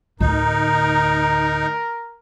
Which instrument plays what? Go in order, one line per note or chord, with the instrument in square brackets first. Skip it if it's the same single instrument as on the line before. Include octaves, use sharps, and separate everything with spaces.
[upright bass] D2 A2 [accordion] D#4 [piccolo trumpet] A#4